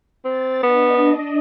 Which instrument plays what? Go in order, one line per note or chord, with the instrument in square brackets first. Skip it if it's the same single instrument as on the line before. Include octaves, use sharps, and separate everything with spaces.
[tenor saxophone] C4 [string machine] A6
[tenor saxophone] B3 [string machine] D4 D#5